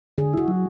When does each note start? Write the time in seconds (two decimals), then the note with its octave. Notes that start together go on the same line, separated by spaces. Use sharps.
0.18 D3 G#4
0.34 E4 F#4
0.48 F#3